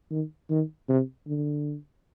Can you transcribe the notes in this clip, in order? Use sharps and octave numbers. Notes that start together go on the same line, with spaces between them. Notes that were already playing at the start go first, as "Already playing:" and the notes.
D#3
D#3
C3
D3